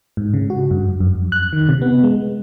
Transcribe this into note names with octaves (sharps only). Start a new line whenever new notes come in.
G#2
C#3
F#4
G2
F#2
F#2
F2
F#6
D#3
C3
B3
G#3